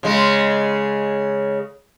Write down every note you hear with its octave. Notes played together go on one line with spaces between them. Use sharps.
C#3 G#3